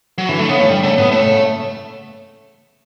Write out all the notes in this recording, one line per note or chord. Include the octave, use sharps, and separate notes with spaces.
F#3
D3 E3
A3
C#3 B3
E3 A3
D3 G3
C#3 A3
A2 B3
A2 A3
C#3